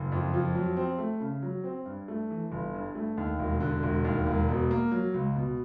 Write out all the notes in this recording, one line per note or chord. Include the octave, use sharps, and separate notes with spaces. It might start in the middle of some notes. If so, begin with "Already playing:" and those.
Already playing: F#1
F2
F3
F#3
C4
A3
C#3
F#3
C4
G2
A3
E3
G1
G2
A3
D#2
E1
D3
E1
D#2
E1
B2
A#3
F#3
C#2
B2